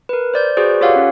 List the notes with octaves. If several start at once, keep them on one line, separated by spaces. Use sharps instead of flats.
A#4 B4
C5 D5 G6
F#4 G#4 B4 C5 D5
F4 G4 A4 C#5 F5 F#5
C#4 C#5